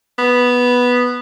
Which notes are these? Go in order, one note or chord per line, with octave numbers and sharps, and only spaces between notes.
B3